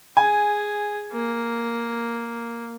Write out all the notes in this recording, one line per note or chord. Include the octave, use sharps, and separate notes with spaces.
G#4 G#5
A#3